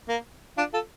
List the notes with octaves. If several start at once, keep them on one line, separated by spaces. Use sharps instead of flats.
A#3
D4 F4
F4 A4